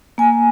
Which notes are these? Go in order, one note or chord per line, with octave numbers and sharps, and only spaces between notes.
A#3 G#5